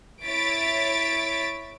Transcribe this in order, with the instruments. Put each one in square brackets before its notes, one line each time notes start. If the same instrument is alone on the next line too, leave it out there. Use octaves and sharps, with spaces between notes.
[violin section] E4 C#5 A6 B6 D7